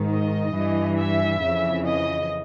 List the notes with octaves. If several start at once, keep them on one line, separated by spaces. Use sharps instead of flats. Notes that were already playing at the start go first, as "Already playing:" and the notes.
Already playing: G#2 D#3
D#5
G2 E3
E5
F2 C#3 E3
D#5